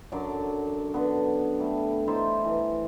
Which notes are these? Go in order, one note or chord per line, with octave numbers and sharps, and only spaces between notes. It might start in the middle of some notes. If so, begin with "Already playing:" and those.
F#2 D3 F#3 D5
D3 B3
G3 A3
D#4 E4 C5 D5
E3